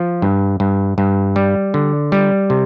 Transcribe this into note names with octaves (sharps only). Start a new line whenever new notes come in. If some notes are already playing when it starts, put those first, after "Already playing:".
Already playing: F3
G2
G2
G2
G3
D3
G3
C3